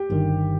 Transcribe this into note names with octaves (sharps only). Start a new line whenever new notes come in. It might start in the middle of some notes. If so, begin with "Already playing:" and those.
Already playing: G4
G1 G2 D#3